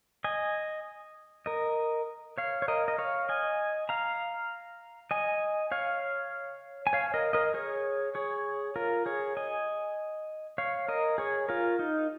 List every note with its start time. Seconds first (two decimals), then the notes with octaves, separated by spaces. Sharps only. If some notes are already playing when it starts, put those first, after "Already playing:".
0.24 D#5 G#5
1.46 A#4 D#5
2.38 C#5 F5
2.62 C#5
2.68 A#4 D#5
2.88 D#5
2.98 C#5 F5
3.29 D#5 G#5
3.89 F5 A#5
5.11 D#5 G#5
5.71 C#5 F5
6.87 G#5
6.93 C#5 F5
7.14 A#4 D#5
7.33 A#4 D#5
7.54 G#4 C#5
8.15 G#4 C#5
8.76 F4 A#4
9.06 G#4 C#5
9.37 D#5 G#5
10.58 C#5 F5
10.88 A#4 D#5
11.18 G#4 C#5
11.49 F4 A#4
11.79 D#4